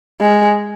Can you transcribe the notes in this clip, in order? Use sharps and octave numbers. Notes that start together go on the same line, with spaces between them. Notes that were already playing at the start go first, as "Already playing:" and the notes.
G#3